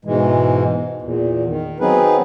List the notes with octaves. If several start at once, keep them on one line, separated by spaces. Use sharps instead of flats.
G#2 B2 E3 G#3
E2 A#2
D#3
F#3 B3 C4 D#4 G#4 B4